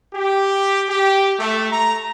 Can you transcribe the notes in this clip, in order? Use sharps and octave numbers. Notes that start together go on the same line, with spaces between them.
G4
G4
A3
A#5